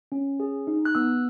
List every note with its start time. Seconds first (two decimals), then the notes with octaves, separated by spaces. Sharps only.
0.12 C#4
0.40 G#4
0.67 D#4
0.85 F#6
0.95 B3 E6